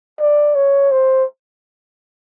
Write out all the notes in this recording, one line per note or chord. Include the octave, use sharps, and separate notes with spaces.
D5
C#5
C5